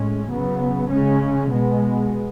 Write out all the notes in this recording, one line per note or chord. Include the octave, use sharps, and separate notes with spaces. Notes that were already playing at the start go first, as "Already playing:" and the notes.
Already playing: A2 G#3 C#4
C#3 F#3 B3
C#3 G#3 C#4
B2 G#3 B3